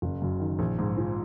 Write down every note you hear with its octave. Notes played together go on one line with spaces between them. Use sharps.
F#1
F#2
D#3
A#1
G#2
F3